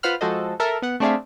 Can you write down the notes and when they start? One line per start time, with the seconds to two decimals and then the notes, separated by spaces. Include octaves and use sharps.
0.03 F4 B4 C5 F#5 B5 F6
0.21 F3 G#3 F#4 A4 C5 D#5
0.60 A4 A#4 E5
0.82 B3 F#5
1.00 A3 C4 D4 G#4 E5 F5